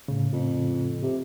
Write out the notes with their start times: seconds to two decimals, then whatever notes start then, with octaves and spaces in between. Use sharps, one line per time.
0.08 A2 C#3
0.33 F2
1.02 C3